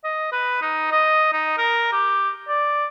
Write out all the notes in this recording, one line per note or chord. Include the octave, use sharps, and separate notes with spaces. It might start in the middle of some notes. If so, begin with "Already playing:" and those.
D#5
B4
D#4
D#5
D#4
A#4
G4
D5